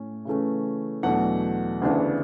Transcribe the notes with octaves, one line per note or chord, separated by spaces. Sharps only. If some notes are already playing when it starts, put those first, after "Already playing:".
Already playing: A2 C#4
C#3 E3 A3 C#4
E2 B2 F#3 A3 D4 F#5
D2 C#3 E3 B3 D4